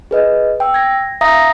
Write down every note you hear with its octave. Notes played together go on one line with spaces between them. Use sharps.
G#4 B4 D#5
G5 E6
G#6 A#6
E5 F5 A#5 D#6 A#6